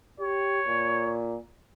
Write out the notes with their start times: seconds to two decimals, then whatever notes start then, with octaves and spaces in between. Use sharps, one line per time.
0.19 G4 C#5
0.67 A#2